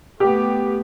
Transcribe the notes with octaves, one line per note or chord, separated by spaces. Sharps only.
A3 B3 G4